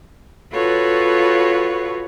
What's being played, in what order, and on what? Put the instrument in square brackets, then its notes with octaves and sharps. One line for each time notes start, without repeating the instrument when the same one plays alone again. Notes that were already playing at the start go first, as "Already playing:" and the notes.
[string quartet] F4 F#4 A4 B4 C#5